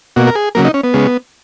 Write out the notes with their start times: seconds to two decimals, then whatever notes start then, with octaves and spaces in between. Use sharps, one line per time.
0.16 B2 A#3 F#4
0.27 A#4
0.35 G#4
0.55 C#3 F#3 A#3 A#4
0.65 D#4
0.74 C#4
0.84 B3
0.94 C#3 G#3